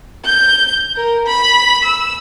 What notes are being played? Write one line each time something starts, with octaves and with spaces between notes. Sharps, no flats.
G6
A#4
B5
E6